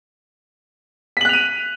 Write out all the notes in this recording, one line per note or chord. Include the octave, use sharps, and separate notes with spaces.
F#6 B6 D#7 F7 F#7